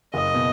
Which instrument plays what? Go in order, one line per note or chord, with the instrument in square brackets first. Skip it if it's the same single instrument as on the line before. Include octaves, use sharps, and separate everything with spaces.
[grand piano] F#1 [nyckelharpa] D#5
[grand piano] B2